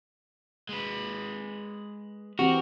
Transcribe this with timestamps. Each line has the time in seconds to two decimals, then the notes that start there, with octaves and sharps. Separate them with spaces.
0.69 G#3 B4
2.39 E3 C4 F#4 G4 A#4